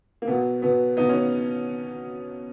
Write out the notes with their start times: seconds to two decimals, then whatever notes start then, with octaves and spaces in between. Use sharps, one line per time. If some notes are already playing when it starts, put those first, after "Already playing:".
0.22 A#3
0.27 B2 F#3 B3
0.62 B2 F#3 B3
0.97 B2 F#3 B3 D#4
1.09 C#4
1.14 B3